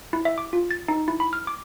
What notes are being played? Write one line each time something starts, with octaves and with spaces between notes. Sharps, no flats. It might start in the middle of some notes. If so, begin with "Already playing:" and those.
E4
E5
D6
F4
A6
D#4
E4
B5
F6
D6